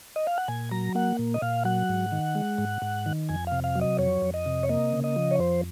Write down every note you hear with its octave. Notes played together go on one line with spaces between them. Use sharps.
D#5
F5
F#5
A#2 G#5
F#3 A#5
A#3 F#5
A#2
D#5
A#2 F5
F#3 F#5
G#2
D#3
G#3
G#2
G#2
D#3
F2 G#5
C3 F5
F5
F#3
D#5
F2 C#5
F2
D#5
C3
C#5
A#3 D#5
C#3
D#5
F3
C#5
F2 C5